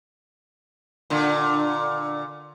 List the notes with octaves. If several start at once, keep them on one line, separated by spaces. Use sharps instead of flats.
A#2 D3